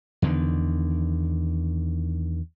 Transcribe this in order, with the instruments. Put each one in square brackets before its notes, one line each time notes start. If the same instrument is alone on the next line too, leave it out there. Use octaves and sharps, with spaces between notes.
[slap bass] E2 D3 D#3